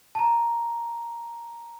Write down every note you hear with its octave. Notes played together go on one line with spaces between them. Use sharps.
A5 A#5